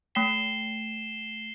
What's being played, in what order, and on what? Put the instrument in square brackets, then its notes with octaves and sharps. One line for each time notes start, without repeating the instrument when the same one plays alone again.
[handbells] A3 G5 B6 [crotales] C7 E7 G7